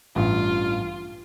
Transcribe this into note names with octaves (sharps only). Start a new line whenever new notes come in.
A1 G2 F4